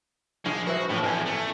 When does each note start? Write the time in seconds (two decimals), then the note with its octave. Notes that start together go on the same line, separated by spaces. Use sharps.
0.46 A#1 G#3
0.67 F#4 B4 C5 E5
0.90 A2 E3 F3
1.03 A1 E2 G#5
1.26 A3